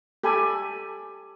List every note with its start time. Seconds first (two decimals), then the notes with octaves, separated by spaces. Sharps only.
0.24 G4 A4 G#5 B5